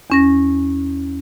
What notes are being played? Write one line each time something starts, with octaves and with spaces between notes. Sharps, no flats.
E2 C#4 A#6